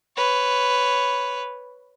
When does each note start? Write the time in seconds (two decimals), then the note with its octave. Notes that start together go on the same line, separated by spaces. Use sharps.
0.17 B4 C#5